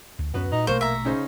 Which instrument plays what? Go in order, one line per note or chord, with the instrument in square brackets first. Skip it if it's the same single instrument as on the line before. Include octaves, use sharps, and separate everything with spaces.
[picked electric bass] D2
[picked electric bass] D1 F#2 C#4 [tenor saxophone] B3 [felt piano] F#4 B4
[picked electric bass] A#2 [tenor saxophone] D#4
[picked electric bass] A#1 B2 A3 [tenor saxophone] A#3 [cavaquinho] C5 [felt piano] C#6
[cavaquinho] E5 A#5
[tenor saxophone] C#3 [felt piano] C#4 D#4 C5